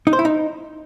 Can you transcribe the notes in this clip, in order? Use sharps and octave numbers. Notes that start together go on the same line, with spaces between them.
D#4
C5
E4
D#4